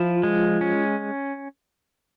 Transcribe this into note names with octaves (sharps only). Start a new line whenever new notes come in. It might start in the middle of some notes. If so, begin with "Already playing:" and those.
Already playing: F3 E4 F4
G#3
C#4